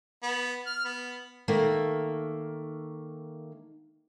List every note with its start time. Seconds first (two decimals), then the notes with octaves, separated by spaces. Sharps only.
0.23 B3
0.67 F6
0.85 B3
1.48 D#3 A3 A#3